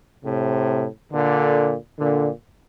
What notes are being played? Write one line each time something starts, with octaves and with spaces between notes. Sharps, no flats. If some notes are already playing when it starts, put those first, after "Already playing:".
A2 C3
A#2 D3
A#2 D3